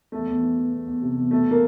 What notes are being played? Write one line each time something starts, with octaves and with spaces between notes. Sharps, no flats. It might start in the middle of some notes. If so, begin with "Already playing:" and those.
E2 A3
E2
E3
E3
E2
E2
C3
E2
B2 A3
A#3